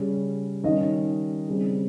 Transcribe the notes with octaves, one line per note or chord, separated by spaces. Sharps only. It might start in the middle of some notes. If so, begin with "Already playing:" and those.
Already playing: C#3 G3 C#4
D#3 G3 C#4 D#5
C#3 G3 C4